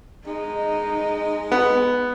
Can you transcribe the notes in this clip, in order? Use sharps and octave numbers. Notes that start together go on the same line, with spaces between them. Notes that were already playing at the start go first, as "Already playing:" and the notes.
G#3 D#4
B3